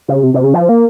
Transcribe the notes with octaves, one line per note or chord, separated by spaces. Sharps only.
C#3
C3
C3
C#3
F3
A#3